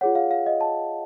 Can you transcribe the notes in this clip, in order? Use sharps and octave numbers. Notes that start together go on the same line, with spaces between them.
F4 G#4 C#5 F#5
F5
F5
D#5
A5